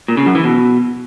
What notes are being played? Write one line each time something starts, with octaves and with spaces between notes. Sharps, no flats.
A#2
C#3
F#2
E3
B2